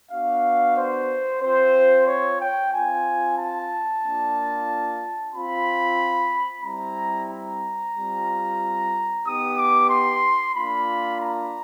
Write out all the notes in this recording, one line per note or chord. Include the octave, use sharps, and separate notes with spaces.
B3 D4 F#4 F5
C5
C4 F4 C5
C#5
G5
C4 F4 G#5
A5
A#3 D4 F4
C4 F4 B5
G3 C4 E4 A#5
A#5
G3 C4 F4
B3 D#4 G4 D#6
D6
C6
A#3 D4 F4 B5
A#5